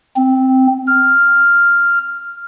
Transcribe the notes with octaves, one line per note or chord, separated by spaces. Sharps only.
C4
F6